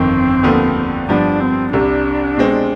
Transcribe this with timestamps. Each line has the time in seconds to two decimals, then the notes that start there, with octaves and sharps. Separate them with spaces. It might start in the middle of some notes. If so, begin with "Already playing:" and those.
Already playing: G1 F2 D#3 C4
0.43 D#2 D3 F3 B3
1.09 G2 F3 B3 D4
1.40 C4
1.73 C2 C3 G3 D4
2.37 B2 G#3 C4